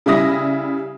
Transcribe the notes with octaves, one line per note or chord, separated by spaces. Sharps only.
C#3 G3 E4 D#6 A#6